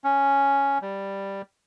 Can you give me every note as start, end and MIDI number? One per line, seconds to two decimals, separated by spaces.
0.04 0.78 61
0.82 1.42 55